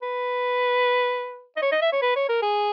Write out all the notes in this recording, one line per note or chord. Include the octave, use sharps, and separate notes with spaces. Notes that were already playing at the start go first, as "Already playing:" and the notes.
B4
D#5
C#5
D#5
E5
C#5
B4
C#5
A#4
G#4